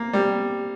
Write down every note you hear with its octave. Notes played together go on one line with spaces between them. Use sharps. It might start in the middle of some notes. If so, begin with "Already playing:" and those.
Already playing: A#3
G3